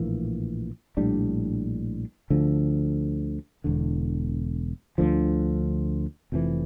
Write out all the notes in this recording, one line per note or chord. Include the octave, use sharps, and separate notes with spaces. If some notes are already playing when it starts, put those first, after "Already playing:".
Already playing: A#1 A2 E3 A#3
A#1 A2 G3 D4
D2 D3 F3
E1 E2 D3
D2 D3 F3
F1 F2 C3 E3